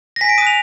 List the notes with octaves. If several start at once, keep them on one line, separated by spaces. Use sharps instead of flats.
A#6
G#5 B6
D7
D#6 F#6 D#7 F7